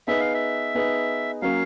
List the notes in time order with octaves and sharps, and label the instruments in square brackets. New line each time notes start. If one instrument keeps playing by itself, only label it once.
[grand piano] B3 D#4 G#4 B4 [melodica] E5
[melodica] F5
E5
[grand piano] B3 D#4 G#4 B4
[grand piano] F#3 A#3 C#4 [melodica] F5